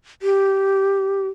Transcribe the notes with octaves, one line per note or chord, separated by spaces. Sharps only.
G4